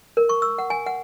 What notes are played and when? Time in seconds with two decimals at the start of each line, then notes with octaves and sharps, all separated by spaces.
0.17 A#4
0.29 C#6
0.42 E6
0.58 F#5
0.70 G#5
0.86 F#5